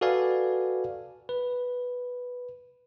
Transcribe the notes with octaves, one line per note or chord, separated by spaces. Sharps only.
F#4 A4 B4 D5 F5 G#5
B4